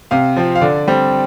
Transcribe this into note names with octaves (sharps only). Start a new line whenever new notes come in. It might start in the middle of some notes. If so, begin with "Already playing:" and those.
C3 F5
F3 C4
F5
D3 D5
G3 C4